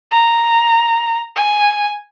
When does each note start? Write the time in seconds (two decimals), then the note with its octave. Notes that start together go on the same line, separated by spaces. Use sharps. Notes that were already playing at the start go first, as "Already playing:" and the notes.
0.12 A#5
1.36 G#5